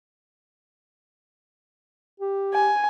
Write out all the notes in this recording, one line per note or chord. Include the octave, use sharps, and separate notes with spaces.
G4
G#5